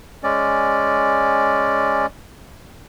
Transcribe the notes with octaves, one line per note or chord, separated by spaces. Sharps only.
G#3 C#4 D5